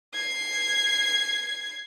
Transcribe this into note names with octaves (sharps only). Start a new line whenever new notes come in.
G#6 C7